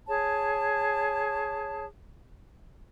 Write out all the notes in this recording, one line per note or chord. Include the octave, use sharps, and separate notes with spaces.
G#4 C#5 A5